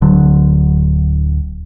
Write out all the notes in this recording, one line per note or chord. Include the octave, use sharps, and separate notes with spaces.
D1 D3 F#3